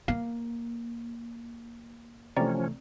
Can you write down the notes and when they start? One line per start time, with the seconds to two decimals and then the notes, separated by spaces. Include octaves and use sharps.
0.08 A#3 F5
2.37 C3 E3 F3 A3 C4 C#4 D5 A#5